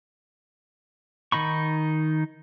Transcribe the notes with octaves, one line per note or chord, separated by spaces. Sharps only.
D#3 D#4 B5 C#6